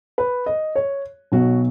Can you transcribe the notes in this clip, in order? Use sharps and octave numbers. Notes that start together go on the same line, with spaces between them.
B4
D#5
C#5
B1 B2 F#3 F#4